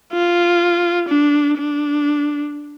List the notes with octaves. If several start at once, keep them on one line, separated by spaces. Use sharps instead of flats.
F4
D4
D4